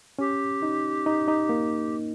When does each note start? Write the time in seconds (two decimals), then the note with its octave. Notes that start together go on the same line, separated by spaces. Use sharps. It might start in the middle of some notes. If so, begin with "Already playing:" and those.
0.19 C#4 G4
0.62 D#4
1.06 D#4
1.28 D#4
1.49 A#3